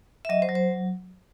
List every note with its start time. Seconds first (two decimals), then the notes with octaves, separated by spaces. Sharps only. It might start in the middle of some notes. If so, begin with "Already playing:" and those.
0.25 E5
0.29 F#3 D#5
0.42 C5
0.49 F#3
0.55 C5